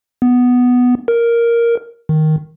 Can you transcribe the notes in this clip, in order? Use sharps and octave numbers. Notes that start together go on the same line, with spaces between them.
B3
A#4
D#3